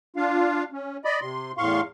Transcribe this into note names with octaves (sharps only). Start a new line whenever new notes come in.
D4 F4 F5
C#4
D5 D#5 B5
C3 C6
E2 A2 F5 C6 C#6